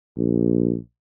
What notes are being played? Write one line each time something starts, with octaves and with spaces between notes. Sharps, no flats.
A#1